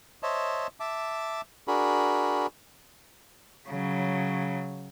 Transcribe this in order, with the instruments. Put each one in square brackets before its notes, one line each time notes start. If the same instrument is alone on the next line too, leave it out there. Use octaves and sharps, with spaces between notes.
[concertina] C5 C#5 D#5 E5 A5
E5 A5 D6
D4 F#4 G#4 A#4 B5
[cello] C#3 F#3